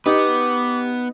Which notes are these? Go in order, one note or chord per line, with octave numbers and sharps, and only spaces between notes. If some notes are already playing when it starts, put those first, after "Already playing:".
B3 D#4 G4 B4 D6